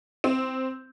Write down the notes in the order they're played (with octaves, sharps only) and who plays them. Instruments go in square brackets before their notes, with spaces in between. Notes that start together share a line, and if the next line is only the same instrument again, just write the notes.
[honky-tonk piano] C4